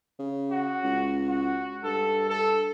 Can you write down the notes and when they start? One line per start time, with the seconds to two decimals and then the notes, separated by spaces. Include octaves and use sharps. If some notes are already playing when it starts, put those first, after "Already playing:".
0.19 C#3
0.51 F#4
0.84 C#2
1.29 F#4
1.84 G2 A4
2.29 A4